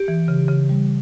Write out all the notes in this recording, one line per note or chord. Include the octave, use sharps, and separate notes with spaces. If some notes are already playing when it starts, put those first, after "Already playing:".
Already playing: G4
E3
C#3
C#3
G3